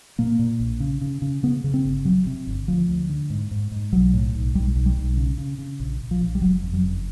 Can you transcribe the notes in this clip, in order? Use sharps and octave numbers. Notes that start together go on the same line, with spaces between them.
A#2 A#3
A#2
A#1
C#3
C#3
C#3
C#3 B3
C#3
C4
G1
C3 F#3
C3
G1
D2 F3
D2
D3
G#2
G#2
G#2
B1 F#3
A2
B1
B1 G3
B1
G3
B1
C#3
C#3
C#3
A#1
A#1
F3
A#1
G3
F#1 F#3
F2
F#3
F#1